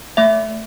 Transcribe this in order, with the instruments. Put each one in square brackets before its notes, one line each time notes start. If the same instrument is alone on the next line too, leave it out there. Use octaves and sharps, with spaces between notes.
[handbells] A3 E5